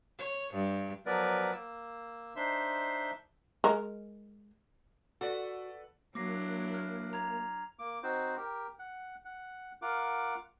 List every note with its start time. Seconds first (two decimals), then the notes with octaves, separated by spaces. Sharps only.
0.19 C#5
0.54 G2
1.06 F3 F#3 B3 A#4 B4 D5
1.53 A#3 E6
2.36 D4 D#4 C5 E5 C6
3.64 G#3 A#4
5.21 F#4 A4 B4 D5
6.15 F#3 A#3 D4 E4 D6 A#6 C7
6.74 F6
7.13 A#5 G#6 F7
7.79 A#3 D6
8.03 C4 D#4 F#4 C5
8.37 G4 A#4
8.79 F#5
9.25 F#5
9.82 F4 A#4 F#5 D6